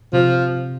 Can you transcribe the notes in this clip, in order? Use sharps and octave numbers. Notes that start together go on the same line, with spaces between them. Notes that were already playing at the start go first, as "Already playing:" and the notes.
C3 F3